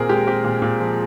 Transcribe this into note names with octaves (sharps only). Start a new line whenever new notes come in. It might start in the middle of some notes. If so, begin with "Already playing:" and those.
Already playing: A#2 C4 G#4 A#4
G#3 G4
C4 G4
A#2
A#2
F3